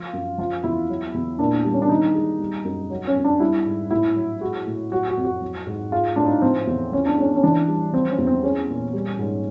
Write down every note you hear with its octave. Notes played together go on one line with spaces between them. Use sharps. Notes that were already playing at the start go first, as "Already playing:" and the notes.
Already playing: F3 F4
F#2
F3 F4
E2 E4
F#3
E2
A#2 D4
G3
C#4
D4
D#3 D#4
G#3
G3
F#2
F#3
C#4
F2
D4
G3 E4
G#2
A2 E4
F#3
G#3 F#4
A2
F#3 F#4
F#4
F2
F#4
F#3
G#2
G#3 F4
A2 D4
D#4
F3 C4
E2
F3 C#4
D4
G#3 C#4
C#4
E3 D4
G3
F3 C4
C#4
E2
C4
G#3 C#4
A#2
G3
G#2